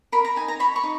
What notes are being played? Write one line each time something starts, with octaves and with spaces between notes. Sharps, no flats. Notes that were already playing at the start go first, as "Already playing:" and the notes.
A#4 B5
A#5
D#4 G#5
A#5
C#5 B5
C#6
D#4